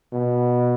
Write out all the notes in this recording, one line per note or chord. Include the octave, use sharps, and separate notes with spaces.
B2